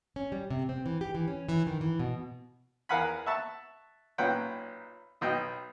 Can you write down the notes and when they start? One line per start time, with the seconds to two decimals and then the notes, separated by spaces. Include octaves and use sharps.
0.16 C#4
0.32 G3
0.50 C3
0.69 C4
0.86 E3
1.01 G4
1.15 E3
1.28 C#4
1.49 E3
1.67 D#3
1.81 E3
1.99 B2
2.89 E2 A#4 F5 F#5 G#5 B5
3.26 E5 F#5 A5 C#6
4.18 B1 A#2 C#4 B4 F#5 G5
5.21 B1 B2 D#5 G5